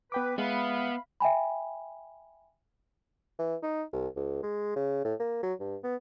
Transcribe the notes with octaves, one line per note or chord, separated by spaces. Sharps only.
B3 B4 G5 D6
G#3 B3 E5 F5 B5
E5 G5 G#5 B5
E3
D#4
C2
C#2
G#3
C#3
A2
A#3
F#3
G2
B3